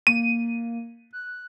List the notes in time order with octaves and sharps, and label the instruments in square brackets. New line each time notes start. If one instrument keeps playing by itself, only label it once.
[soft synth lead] A#3 [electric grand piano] D#7
[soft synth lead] F#6